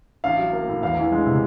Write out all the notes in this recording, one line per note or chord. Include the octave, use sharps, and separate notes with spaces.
A1 F5
F#3
A#3
A2
E2 F5
E3
G#3
C3